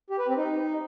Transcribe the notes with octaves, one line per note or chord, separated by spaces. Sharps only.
G4
B4
C4
D#4